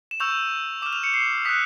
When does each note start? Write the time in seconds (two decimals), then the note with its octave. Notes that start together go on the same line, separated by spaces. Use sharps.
0.11 E7
0.20 C#6 E6 G6 F7
0.82 D6 E7
0.86 F6
0.93 F7
1.04 C#7
1.14 C7
1.45 D#6 F#6 B6